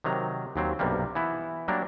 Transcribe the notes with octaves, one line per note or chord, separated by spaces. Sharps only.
C3 D#3 F#3 A#5
D#2 F#3 C4
B1 G2 C3 G3 A#3
E3 B3 E4
F#3 G3 A#3 D4 A#4